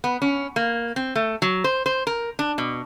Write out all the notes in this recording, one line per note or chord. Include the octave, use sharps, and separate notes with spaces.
B3
C#4
A#3
C4
A3
F#3
C5
C5
A#4
D4
B2